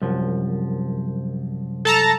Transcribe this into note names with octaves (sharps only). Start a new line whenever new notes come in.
C2 F#2 F3
A4 A5 A#5